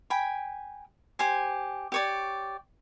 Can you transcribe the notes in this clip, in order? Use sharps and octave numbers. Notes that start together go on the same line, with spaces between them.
G5 G#5 B5
G4 C5 G#5
G4 C#5 D5